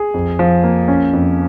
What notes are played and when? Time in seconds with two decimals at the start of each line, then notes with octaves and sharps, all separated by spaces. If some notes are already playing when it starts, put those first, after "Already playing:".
Already playing: G#4
0.14 F2
0.39 F3
0.64 A#3
0.88 C#4
1.13 F2